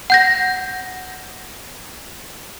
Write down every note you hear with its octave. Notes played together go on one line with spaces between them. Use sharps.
F#5 G6 A#6